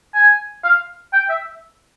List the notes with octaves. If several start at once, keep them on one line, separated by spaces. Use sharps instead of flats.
G#5
F5
G5
E5